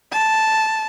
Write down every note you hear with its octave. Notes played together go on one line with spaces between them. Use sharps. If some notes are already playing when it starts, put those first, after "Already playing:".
A5